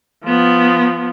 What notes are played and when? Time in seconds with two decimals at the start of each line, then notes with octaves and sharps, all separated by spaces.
0.25 F3 B3